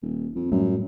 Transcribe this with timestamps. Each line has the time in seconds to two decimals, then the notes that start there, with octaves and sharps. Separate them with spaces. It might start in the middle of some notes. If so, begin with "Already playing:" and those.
0.02 D#1
0.36 F2
0.51 F#2 A2 G3 A3